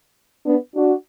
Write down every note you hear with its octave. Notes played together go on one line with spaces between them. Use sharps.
B3 D4
D4 F#4